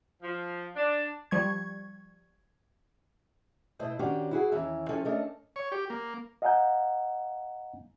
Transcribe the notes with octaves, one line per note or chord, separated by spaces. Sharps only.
F3
D4
F3 G3 C#6 G#6
B2 A3 E4 C5 D#5
D#3 C#4 D4 F#4 G4 C5
E4 F#4 G#4
D#2 E3 C#4 E5
C3 F3 C#4 A4 G#5
A3 C#4 D4 A4 A#4 D#5
C#5
G4
A#3
D#5 F5 F#5 G#5 A#5 G6